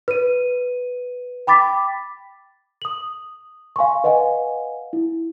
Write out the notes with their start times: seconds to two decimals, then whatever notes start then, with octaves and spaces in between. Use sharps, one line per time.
0.08 B4 D#7
1.47 G5 B5 D6 A6 B6
2.82 D#6 F#7
3.76 F5 G#5 C6 C#6
4.04 B4 D#5 F5 F#5 G#5
4.93 E4